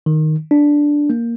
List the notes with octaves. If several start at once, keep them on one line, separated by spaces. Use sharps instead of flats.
D#3
D4
A#3